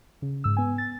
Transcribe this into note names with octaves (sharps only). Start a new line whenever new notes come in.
C#3
G#2 E6
B3 G#5
A6